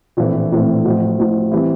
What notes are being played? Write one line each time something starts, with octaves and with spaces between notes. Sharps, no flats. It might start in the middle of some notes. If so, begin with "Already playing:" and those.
A#1 A2 E3 A3 C4
A#1 A2 E3 A3 C4
A1 A2 F3
A1 A2 F3
E3 G3 C4 E4